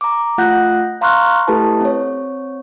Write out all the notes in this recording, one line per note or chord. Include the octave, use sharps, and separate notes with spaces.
A#5 D6
A3 F4 F#5 F#6 G6 A#6
F5 A#5 C6 C#6 F6 F#6
A3 E4 G4 A4 B4 A5
C4 C#5